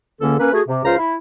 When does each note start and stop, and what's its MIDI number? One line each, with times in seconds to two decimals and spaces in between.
0.21 0.35 37
0.21 0.35 50
0.21 0.35 58
0.21 0.35 61
0.21 0.35 69
0.40 0.52 58
0.40 0.52 61
0.40 0.52 71
0.53 0.62 57
0.53 0.62 66
0.53 0.62 68
0.67 0.81 48
0.84 0.95 37
0.84 0.95 65
0.84 0.95 72
0.84 0.95 77
0.84 0.95 82
0.98 1.15 64